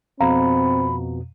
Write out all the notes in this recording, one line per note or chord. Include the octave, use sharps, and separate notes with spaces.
F2 B2 C4 F5 A#5 B5